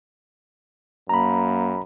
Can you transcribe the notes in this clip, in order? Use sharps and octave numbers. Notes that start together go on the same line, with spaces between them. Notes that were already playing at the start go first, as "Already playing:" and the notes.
F#2 A#3 A#5 B5